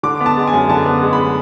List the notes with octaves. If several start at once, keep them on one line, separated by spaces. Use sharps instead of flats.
D3 D6
B3
A5
G#3
G#5
F#2
D3 A5
B3
G#3
B5